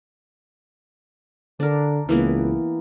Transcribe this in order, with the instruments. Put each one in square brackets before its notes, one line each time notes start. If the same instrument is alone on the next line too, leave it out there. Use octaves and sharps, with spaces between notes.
[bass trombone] D3 [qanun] D4 A#4
[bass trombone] C#2 [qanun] E3 A#3 B3